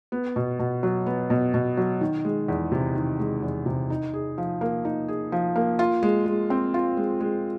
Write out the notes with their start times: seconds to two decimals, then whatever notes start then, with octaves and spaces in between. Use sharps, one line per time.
0.12 B3
0.36 B2
0.59 B2
0.83 F#3
1.06 B3
1.30 B2
1.54 B2
1.77 F#3
2.01 D#3
2.25 G#3
2.48 E2
2.72 C3
2.95 D#3
3.19 G#3
3.43 E2
3.66 C3
3.90 D#4
4.14 G#4
4.38 F3
4.61 A#3
4.85 D#4
5.08 G#4
5.32 F3
5.56 A#3
5.79 F4
6.03 G#3
6.26 G#3
6.50 C4
6.74 F4
6.97 G#3
7.21 G#3